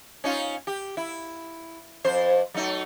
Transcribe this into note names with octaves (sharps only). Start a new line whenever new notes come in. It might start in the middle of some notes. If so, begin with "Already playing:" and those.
C#4 D#4 F4
G4
E4
F2 C5
F#3 A3 D#4